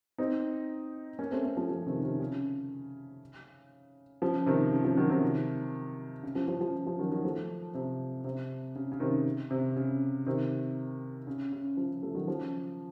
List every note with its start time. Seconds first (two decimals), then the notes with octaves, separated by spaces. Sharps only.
0.18 C4 D#4
1.19 A#3 C#4
1.32 A3 C4
1.44 A3 C4
1.57 F3 A3
1.69 C#3 F3
1.86 C3 D#3
2.03 C3 D#3
2.20 C#3
4.22 C#3 F3
4.46 C3 D#3
4.72 C#3
4.84 C#3 F3
4.97 D#3 F#3
5.10 C3 D#3
6.23 C#3
6.35 C#3 F3
6.48 C#3 F3
6.61 C#3 F3
6.86 C#3 F3
6.98 D#3 F#3
7.11 D#3 F#3
7.24 F3 A3
7.74 C3
8.24 C3
8.75 C#3
8.92 C#3
9.00 C3 D#3
9.51 C3
9.76 C#3
10.26 C3 D#3
11.27 C#3
11.53 C#3
11.77 C#3 F3
12.02 F3 A3
12.15 D#3 F#3
12.27 C#3 F3